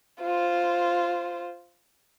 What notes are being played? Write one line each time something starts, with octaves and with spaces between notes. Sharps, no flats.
F4 C5